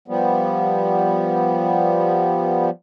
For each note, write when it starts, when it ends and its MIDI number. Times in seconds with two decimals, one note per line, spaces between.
0.08 2.70 53
0.08 2.70 55
0.08 2.70 59